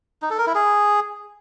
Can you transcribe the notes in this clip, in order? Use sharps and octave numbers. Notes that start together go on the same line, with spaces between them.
D#4
A4
A#4
E4
G#4